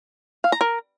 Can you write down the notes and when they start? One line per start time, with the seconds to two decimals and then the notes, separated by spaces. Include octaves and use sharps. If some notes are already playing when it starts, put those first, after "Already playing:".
0.44 F5
0.52 A#5
0.61 A#4